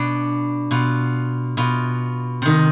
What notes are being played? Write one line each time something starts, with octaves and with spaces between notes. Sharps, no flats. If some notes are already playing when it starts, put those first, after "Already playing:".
Already playing: B2 D4
B2 F4
B2 F4
C3 D#3